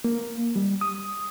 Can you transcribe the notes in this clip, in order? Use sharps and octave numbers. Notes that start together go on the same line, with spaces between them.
A#3
G3
D#6